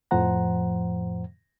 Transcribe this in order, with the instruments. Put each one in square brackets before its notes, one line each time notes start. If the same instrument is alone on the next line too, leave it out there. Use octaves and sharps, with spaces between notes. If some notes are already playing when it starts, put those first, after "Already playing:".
[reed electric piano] F2 A2 F3 C5 F#5 A#5